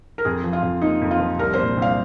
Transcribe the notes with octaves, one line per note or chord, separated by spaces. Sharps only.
A#4
F2 G#4
F3
F4
F2
A#3 D#4
F2
F4
F3
C2 A#4
C5
A#2
C2
F5